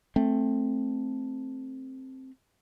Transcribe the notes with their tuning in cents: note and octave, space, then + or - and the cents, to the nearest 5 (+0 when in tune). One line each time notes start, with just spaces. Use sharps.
A3 +0 C4 +10